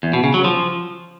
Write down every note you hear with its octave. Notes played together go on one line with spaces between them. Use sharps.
E2
B2
C#3
F#3
F3